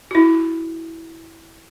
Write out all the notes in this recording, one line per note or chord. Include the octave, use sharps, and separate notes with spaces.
E4 F#4